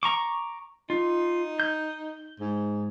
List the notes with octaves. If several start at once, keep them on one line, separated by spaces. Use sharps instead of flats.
A#5 C#6 D6
D#4 F4
G6
G#2